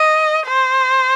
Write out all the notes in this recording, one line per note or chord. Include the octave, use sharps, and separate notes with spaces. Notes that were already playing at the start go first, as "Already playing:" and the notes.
Already playing: D#5
C5